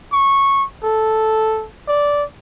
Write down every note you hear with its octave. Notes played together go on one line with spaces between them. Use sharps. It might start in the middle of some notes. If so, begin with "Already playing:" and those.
C#6
A4
D5